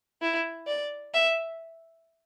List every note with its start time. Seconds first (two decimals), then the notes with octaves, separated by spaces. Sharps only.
0.22 E4
0.67 D5
1.14 E5